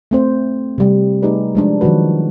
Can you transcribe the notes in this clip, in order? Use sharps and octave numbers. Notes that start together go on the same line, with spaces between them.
A3 C4 C5
C3 G3
A3 D#4 G4 G#4 B4 D5
F3 G#3 D4
D#3 F3 F#3 F#4 B4